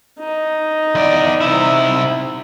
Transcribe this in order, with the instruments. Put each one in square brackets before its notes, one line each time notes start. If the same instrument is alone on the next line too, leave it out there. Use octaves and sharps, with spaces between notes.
[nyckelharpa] D#4
[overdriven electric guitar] E2 D5
C3 E4